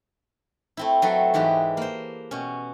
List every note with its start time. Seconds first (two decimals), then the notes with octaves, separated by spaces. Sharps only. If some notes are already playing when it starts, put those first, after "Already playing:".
0.77 A3 C4 E4
1.02 F#3 A3 C4 A4 B4
1.34 G#2 E3 G#3 G4 B4
1.77 A#3 C5
2.31 B2 C#4